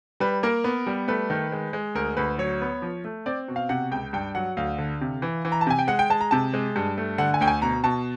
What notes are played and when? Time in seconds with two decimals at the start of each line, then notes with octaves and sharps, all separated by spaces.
0.20 G3 B4
0.43 A#3 A#4
0.64 B3
0.87 G3
1.08 A3 B4
1.30 D#3
1.52 G#3
1.73 G#3
1.95 D2 A#4
2.17 D2 B4
2.38 F#3 C#5
2.61 B3
2.82 F3
3.04 A3
3.26 C4 D5
3.48 B2
3.56 F5
3.69 C3 F#5
3.91 C#2 G5
4.13 G2 G5
4.35 F#3 F#5
4.57 D2 F5
4.78 D3
5.01 C3
5.22 E3
5.45 E3
5.52 A#5
5.61 A5
5.67 C3 G#5
5.79 G5
5.88 G#3 F#5
5.99 G5
6.10 G#3 A5
6.21 A#5
6.31 C3 A5
6.54 G#3
6.76 G2
6.98 A3
7.18 D3 F#5
7.34 G#5
7.41 D2 G5
7.48 G#5
7.62 B2 A#5
7.84 B2 A5